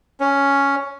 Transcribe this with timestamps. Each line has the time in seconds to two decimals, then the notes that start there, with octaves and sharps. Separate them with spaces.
0.20 C#4